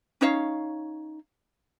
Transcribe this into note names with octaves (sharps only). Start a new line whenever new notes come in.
C#4 D#4 C#5 F5